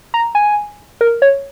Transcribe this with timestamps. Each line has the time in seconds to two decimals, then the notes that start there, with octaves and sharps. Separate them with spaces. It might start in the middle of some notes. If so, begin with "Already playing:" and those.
0.14 A#5
0.35 G#5
1.01 A#4
1.22 C#5